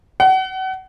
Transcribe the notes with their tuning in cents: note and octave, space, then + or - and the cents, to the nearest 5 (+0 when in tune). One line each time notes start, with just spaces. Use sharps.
F#5 +35